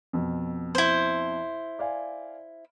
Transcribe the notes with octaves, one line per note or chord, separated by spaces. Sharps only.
F2 B2
E4 C5
D5 F5 G#5